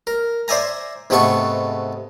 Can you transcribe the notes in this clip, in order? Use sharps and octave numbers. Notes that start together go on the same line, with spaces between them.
A#4
C5 D5 E5 G#5 A#5
G#2 C3 A3 B3 A4 C#6